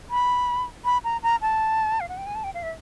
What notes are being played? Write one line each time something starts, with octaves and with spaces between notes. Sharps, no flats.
B5
B5
A#5
A#5
A5
F5
F#5
G5
G#5
A5
G5
F5
E5